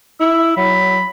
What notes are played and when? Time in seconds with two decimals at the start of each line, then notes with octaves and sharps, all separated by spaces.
0.20 E4 E6
0.57 F#3 B5